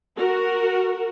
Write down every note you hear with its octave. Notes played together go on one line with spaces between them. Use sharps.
F#4 A#4